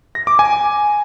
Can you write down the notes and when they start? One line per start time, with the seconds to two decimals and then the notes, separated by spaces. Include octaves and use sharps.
0.15 A#6
0.27 D6
0.39 G#5